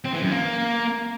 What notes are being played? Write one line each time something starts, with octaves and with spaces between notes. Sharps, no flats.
C4
E3
F#2
A#3